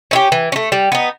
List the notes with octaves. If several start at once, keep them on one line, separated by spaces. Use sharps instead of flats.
C#4 E4 G4
E3
C#4
A3
G3
B3 D#4